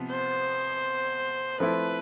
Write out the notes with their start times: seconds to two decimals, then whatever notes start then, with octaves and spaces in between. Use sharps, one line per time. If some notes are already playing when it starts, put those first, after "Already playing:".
Already playing: C3 F3 B3
0.09 C5
1.60 F3 A3 C4 E4 B4